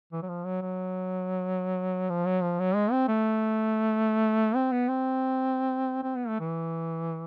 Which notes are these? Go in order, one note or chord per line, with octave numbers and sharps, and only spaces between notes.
E3
F#3
F3
F#3
F#3
F3
F#3
F3
F#3
G#3
C4
A3
C4
B3
C4
C4
B3
A3
E3